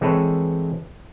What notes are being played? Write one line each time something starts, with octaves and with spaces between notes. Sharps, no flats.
E3 G#3 C4 A4 B4 C#5